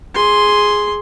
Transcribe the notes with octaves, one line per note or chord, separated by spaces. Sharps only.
G#4 C6